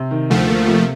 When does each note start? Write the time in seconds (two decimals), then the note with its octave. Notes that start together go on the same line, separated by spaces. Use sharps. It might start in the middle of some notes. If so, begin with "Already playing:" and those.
Already playing: C3
0.11 D#3
0.30 D2 F3 A3
0.49 A#3
0.67 C3